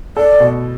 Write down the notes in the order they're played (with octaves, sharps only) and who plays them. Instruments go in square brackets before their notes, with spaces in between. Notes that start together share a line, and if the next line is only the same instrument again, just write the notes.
[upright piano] A4 [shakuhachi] D5
[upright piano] B2